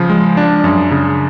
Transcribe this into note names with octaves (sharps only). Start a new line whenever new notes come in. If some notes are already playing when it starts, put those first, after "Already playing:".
Already playing: C#3 F3
G#3
D4
F#2
C#3